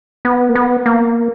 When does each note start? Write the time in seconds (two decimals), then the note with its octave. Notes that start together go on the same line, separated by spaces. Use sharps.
0.25 B3
0.49 A#3
0.55 B3
0.86 A#3